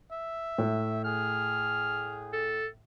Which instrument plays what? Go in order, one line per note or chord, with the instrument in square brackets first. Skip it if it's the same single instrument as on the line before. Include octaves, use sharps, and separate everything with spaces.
[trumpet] E5
[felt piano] A2
[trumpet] G#4 [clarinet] F6
[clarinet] A4